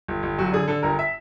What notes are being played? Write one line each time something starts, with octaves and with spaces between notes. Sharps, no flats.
G1
G1
F#2 F#4
D3 G#4
D3 A4
G1 A#4
E5